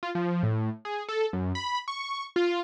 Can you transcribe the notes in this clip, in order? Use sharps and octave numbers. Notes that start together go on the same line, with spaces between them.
F4
F3
A2
G#4
A4
F#2
B5
C#6
F4